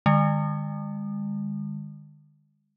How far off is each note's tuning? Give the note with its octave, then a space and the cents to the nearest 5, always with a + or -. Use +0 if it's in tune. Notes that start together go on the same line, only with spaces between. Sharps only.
D3 +40 G#3 -40